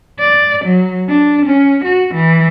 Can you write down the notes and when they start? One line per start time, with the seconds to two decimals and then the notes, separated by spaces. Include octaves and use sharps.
0.19 D5
0.65 F#3
1.09 D4
1.46 C#4
1.84 F#4
2.14 E3